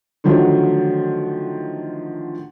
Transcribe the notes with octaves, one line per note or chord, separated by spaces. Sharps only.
D3 D#3 F3 F#3 A3